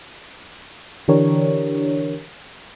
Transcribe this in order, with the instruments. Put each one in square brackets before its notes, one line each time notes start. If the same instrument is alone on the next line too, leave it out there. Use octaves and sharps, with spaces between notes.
[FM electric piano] D3 E3 D4 G4 A#4 C#5